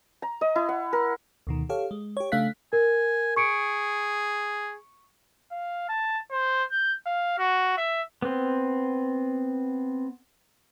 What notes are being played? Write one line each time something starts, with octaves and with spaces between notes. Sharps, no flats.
A#5
D#5
E4
F#5
A#4
D2 B2 D#3
G4 A4 C#5 F5
G#3
G4 C#5
C#3 A3 D4 F5 F#6 B6
A#4 G#5
G#4 C#6 C#7 D7
F5
A5
C5
G6
F5
F#4
E5
B3 C4